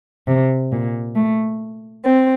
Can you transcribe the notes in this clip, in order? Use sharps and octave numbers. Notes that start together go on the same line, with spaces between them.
C3
A#2
A3
C4